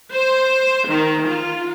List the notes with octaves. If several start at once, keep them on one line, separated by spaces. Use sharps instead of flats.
C5
D#3
F4